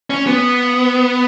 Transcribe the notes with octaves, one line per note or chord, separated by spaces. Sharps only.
C#4
B3